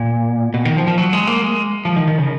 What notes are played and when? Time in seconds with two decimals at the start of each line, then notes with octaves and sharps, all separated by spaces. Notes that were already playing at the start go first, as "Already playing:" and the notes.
Already playing: A#2
0.54 B2
0.65 D#3
0.77 F3
0.87 F3
0.98 F#3
1.13 G#3
1.27 A#3
1.42 G#3
1.85 F3
1.96 D#3
2.08 D#3
2.18 C#3